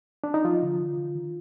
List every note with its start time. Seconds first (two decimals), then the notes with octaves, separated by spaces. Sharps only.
0.24 D4
0.34 D#4
0.44 F3 F4
0.63 D3
0.79 D3
0.98 D3
1.15 D#3